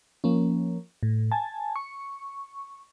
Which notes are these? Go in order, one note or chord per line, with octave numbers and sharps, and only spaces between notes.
F3 A#3 C#4
A2
G#5 A5
C#6